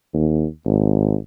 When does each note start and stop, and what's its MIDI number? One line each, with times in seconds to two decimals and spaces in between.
0.14 0.46 39
0.65 1.16 32